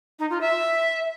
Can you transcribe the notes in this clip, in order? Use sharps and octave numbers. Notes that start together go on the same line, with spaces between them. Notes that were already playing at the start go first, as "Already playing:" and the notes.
D#4
F4
E5